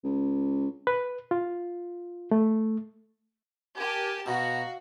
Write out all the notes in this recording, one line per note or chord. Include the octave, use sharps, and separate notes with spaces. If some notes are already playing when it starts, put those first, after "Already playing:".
C#2
B4
F4
A3
G4 A#4 G#5 A5
B2 F#4 F5 A#5